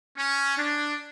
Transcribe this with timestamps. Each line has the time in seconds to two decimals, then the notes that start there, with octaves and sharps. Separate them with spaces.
0.18 C#4
0.58 D4